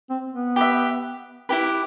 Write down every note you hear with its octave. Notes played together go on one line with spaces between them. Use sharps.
C4
B3
G4 B4 E5
E4 G4 B4